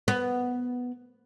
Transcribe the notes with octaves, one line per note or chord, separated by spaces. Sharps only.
B3